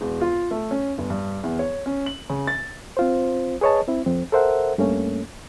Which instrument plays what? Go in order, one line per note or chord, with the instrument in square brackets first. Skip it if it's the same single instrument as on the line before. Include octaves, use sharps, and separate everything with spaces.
[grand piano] E1
F4
A3
C#4
G1
G2
E2
C#5
C#4
F#7
C#3
A6
[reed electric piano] C4 F4 C5
G#4 B4 C#5 D#5 A5
C4 E4
F2 C4
A4 A#4 C5 E5 F#5
G2 A3 A#3 C#4